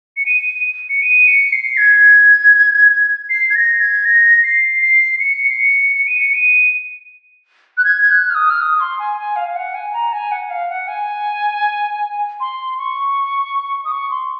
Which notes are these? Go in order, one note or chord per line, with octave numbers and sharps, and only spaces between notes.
C#7
D#7
C#7
D#7
C#7
C7
G#6
C7
G#6
A#6
G#6
A#6
C7
C7
C#7
C7
C#7
C#7
D#7
C#7
D#7
F#6
G#6
G#6
F#6
F6
D#6
F6
D#6
C6
G#5
G#5
F5
F5
F#5
G#5
A#5
G#5
F#5
F5
F#5
G#5
C6
C#6
D#6
C#6
C6